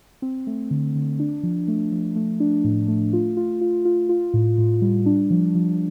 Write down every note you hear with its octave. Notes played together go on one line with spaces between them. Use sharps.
C4
A3
D3
D3
D4
F3
A3
F3
A3
D4
A2
A3
F4
F4
F4
F4
F4
A2
A2
G3
D4
F3
F3